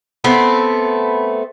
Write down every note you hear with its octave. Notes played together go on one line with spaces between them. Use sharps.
A3 B3 C4